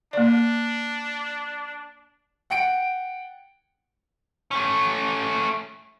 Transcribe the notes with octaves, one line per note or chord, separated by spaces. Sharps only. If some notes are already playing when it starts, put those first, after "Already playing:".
A#3 D4 D5
F#5 G5 C#7 D7
A3 C#4